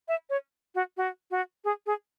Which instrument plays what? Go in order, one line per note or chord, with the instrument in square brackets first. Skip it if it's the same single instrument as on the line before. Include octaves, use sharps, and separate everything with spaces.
[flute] E5
C#5
F#4
F#4
F#4
G#4
G#4